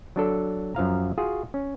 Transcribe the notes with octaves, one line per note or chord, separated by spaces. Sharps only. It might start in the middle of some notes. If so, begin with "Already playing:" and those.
F#3 D4 A4
F#2 F3 F5 A#5
F4 F#4 G#4
C#4